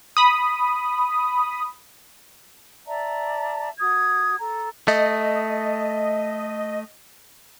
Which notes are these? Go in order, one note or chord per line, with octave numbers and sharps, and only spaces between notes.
B5 D#6
D5 E5 A5 A#5
F#4 D#6 G#6
A4 A#5
A3 D#5